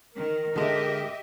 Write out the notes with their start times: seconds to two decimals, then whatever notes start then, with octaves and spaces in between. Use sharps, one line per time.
0.15 D#3 A#4
0.56 D3 G#3 G4 D#5 E5